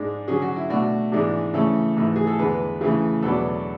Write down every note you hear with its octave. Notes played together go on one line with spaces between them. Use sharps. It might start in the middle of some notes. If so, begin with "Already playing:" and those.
Already playing: G#2 G#3 D4
D3 F#3 C#4 G#4
F#4
E4
B2 A3 D4 F#4
G#2 E3 G#3 B3 D4
C#3 E3 A3 C#4 A4
G#2 E3 A3
G#4
A4
E2 D3 G#3 B4
C#3 E3 A3
E2 B2 F#3 B3 D4 A4